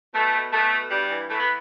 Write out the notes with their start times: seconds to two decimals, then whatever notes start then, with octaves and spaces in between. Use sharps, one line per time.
0.14 B2 A3
0.34 B2
0.53 B2 A3
0.72 B2
0.91 G2 G3
1.10 E3
1.30 E3 A3
1.40 B3